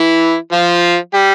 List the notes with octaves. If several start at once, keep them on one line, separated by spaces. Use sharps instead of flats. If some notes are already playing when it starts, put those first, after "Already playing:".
Already playing: E3 E4
F3 F4
G3 G4